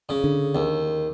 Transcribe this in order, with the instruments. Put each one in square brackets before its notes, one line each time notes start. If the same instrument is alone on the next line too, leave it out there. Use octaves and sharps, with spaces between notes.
[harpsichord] C#3
[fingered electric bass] D3
[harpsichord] D#2